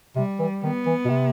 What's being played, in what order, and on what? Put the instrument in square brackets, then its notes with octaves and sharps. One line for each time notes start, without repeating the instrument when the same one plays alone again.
[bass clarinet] C3 [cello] G3
[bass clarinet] E3
[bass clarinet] D#3 [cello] B3
[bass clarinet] E3
B2
C3